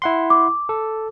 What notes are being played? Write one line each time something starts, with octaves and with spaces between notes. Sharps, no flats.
E4 F#5 C6
D6
A4